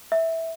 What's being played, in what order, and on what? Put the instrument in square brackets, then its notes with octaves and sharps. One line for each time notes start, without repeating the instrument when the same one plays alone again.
[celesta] E5